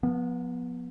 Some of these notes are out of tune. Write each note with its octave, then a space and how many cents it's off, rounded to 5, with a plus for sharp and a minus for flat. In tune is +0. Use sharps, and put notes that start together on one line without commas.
F3 +30 B3 -15